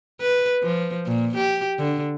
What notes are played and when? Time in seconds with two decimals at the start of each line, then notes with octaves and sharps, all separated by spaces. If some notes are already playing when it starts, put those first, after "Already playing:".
0.21 B4
0.63 F3
1.07 A#2
1.36 G4
1.79 D3